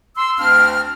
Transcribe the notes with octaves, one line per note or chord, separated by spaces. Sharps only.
C6 E6
D2 C4 D4 F5 F6